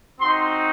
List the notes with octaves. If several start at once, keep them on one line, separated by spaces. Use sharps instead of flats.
C4 D#4 F#4 C6